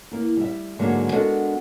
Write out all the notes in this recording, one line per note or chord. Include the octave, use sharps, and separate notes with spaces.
A#3 E4
G3 E5
G#2 D3 F#3 G#3 A#3
G#3 B3 D4 F#4 A4 A#4